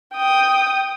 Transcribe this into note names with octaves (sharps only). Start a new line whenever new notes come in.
G5 D#6